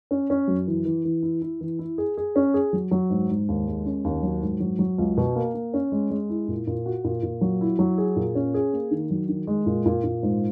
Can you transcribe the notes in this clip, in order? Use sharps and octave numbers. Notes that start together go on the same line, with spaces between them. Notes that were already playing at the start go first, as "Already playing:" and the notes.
C#4
C#4
F#2
E3
E3
E3
E4
E4
E3
E4
G#4
G#4
C#4
G#4
F#3
F#3
G#2
G#2
D#2
G#3
C#4
D#2
F#3
G#2
F#3
F#3
C#2
B2
A#3
A#3
C#4
G#3
G#3
E4
A#2
A#2
F#4
A#2
A#2
F#3
E4
F#3
G#4
A#2
C#4
G#4
A#3
D#3
F#3
D#3
G#3
A#2
A#2
A#2
G#2